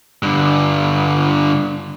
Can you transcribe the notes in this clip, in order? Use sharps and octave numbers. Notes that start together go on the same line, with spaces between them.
G2 D3